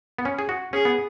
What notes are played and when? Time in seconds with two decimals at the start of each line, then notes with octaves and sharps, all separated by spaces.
0.19 B3
0.25 C#4
0.39 G#4
0.49 F#4
0.73 C#4 G#4
0.85 B3